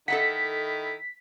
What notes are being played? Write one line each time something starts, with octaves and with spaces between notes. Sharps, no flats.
D#3 E4 A4 D#5 F#5 B6